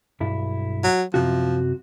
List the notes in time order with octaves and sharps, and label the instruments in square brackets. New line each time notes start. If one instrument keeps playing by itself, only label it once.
[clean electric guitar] B1 G2 E4
[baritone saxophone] F#3
[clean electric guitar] F#2 C3 F#4 [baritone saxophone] F3